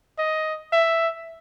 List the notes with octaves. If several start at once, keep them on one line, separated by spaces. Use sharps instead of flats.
D#5
E5